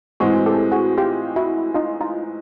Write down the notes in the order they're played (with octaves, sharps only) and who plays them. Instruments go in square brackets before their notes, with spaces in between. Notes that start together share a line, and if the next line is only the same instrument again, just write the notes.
[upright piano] A2 E3 G#3 C4 [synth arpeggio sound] F#4 G#4
[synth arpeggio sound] G4 A4
F#4 G#4
F4 G4
E4 F#4
D#4 F4
D#4 F4